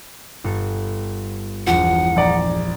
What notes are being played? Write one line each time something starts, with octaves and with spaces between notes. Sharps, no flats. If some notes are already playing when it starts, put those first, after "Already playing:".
G1 A4
E1 F3 F#5
A#1 D5 A#5